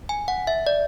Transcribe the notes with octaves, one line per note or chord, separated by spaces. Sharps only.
G#5
F#5
E5
D5